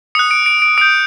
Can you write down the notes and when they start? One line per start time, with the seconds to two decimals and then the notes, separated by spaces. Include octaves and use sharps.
0.15 D#6 F#6 C#7
0.31 D7
0.46 D7
0.62 D7
0.78 D#6 G6 D7